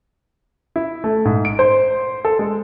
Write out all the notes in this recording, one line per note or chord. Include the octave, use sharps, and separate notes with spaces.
E4
A3
G#2
D7
C5
A4
G#3